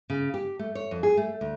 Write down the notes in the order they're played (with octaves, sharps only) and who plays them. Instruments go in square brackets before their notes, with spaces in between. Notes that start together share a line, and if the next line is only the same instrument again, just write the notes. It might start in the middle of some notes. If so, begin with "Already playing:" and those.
[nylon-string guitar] C#3
G4
A3
C#5
F2
G#4
A3
D2